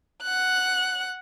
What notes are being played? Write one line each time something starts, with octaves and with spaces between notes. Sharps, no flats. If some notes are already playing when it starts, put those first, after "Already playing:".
F#5 F#6